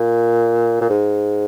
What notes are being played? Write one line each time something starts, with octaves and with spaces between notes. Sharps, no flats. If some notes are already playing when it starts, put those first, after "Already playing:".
Already playing: A#2
A#2
G#2